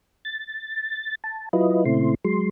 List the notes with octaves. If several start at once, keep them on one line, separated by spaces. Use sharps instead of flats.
A6
A5
F#3 E4 F4 B4 D#5
A#2 C#3 A3 C4 E4 C6
F#3 G#3 C6